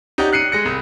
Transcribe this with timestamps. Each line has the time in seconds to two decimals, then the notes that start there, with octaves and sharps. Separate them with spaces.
0.18 D#4 G4 C#5 D5 F#5 A#5
0.33 F#6 C7 C#7 D#7
0.52 G#3 A#6 C#7
0.65 C2